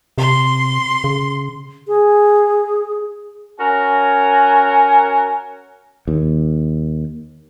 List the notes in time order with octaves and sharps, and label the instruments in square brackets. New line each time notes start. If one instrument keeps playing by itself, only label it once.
[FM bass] C3 [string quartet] C6
[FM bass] C#3
[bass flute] G#4
[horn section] C#4 F#4 A#4 G#5
[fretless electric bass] D#2